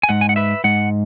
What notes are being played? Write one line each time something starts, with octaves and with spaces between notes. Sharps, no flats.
G#5
G#2 G#3 F#5
G#5
F#5
B4 E5
G#2 G#3 F#5